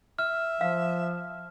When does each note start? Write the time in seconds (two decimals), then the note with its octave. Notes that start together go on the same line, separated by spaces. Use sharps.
0.19 E5 F6
0.61 F3 F5